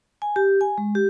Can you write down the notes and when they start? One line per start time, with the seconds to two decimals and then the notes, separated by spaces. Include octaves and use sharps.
0.22 G#5
0.36 G4
0.61 G#5
0.78 G#3
0.95 G4